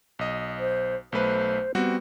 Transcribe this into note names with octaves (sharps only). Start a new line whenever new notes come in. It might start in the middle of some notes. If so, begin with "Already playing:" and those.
B1 D#5
C5
B1 A3 B4 C5
G3 B3 C4 F#4